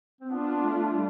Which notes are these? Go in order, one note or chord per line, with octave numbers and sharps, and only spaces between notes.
C4
B3 D4 F4
A3
G3